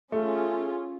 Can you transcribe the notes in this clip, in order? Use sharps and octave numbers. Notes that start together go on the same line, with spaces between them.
A3 C#4 F4 G#4